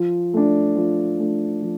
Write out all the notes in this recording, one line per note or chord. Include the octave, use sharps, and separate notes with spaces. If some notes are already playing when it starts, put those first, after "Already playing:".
Already playing: F3
A3 D4
F3
A3 D4
F3